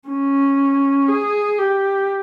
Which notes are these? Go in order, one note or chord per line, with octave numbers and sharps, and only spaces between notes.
C#4
G#4
G4